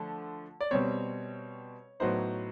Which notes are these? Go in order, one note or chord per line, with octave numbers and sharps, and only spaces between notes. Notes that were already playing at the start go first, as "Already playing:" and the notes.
Already playing: D3 F3 A3
D5
B2 G3 C4 C#5
A2 F#3 B3 D#4 C5